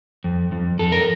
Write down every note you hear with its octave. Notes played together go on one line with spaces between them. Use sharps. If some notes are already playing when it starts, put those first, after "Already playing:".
F2
F2
F2 A4
A#4